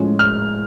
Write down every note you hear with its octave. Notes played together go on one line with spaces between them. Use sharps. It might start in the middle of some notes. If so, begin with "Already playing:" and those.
Already playing: A2 F3 G#3 C#4
F6